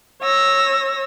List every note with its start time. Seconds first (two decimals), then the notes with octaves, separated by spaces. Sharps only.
0.21 C#5 E6 A#6